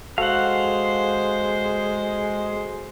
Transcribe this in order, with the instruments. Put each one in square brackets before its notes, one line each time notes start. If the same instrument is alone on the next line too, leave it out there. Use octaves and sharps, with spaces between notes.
[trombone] G#3 [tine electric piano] F#4 A4 [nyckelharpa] C5 [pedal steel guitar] F5 F#5